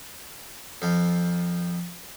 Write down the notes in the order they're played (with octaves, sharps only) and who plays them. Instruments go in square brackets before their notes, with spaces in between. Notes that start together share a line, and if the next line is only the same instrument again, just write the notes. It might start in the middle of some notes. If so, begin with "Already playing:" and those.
[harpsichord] F2 F3